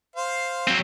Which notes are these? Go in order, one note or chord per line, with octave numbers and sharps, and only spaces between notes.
C5 F5
F#3 C4